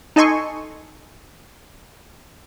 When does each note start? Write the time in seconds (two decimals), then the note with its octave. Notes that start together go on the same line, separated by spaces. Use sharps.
0.16 D#4 A4 D#5 G#5 C6 C#6